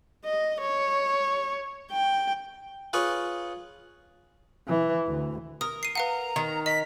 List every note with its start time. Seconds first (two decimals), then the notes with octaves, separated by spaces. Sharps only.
0.25 D#5
0.61 C#5
1.92 G5
2.93 F4 G#4 B4 C#5
4.68 E3
5.06 D2
5.61 A#4 D#6
5.83 C7 D#7
5.95 B4 F5 F#5 A#5
6.36 D#3
6.66 D#5 B6